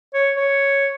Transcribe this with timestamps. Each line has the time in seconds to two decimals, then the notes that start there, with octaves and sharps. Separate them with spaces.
0.14 C#5
0.37 C#5